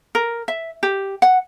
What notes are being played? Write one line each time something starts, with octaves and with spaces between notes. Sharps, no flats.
A#4
E5
G4
F#5